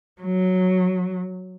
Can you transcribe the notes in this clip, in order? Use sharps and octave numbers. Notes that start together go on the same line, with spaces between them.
F#3